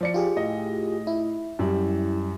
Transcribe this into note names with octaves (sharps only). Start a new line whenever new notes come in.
F3 D5 C#7
F4 G4 G#4
A2 D#5
E4
F#2 G3